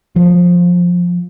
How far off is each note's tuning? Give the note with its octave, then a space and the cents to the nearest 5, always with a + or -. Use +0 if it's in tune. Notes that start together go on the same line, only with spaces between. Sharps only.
F3 +15